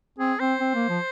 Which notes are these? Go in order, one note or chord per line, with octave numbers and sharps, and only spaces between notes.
C4 G#4
C4 C5
C4
A#3
F3